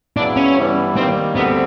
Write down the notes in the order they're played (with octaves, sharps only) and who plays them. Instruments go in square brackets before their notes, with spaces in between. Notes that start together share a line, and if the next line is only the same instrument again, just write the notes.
[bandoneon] C#3 F#3 B3 E4 [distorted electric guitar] D4
[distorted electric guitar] C#4
[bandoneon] G2 E3 G3 B3 E4
[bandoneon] D#3 G3 A#3 [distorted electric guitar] C4
[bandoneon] D2 D3 G3 C4 [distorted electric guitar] B3